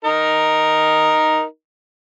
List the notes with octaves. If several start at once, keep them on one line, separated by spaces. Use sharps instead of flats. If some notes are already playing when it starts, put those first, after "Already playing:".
D#4 A#4